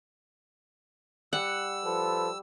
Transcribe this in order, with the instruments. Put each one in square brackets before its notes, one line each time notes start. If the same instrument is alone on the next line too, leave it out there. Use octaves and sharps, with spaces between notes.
[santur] G3 [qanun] F#5 [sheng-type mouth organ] E6
[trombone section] F3 A4 B4